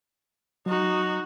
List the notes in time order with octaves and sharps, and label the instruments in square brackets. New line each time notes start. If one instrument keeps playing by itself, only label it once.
[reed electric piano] F#3 [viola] D#4 F#4